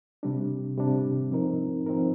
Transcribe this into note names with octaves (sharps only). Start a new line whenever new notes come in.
C3 G3 D4
C3 G3 D4
F3 C4 D#4 A#4
F3 C4 D#4 A#4